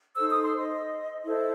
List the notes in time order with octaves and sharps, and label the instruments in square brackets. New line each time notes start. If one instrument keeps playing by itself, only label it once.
[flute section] D#4 A4 C5 E6
D#6
C6
D#5
E4 A4 C5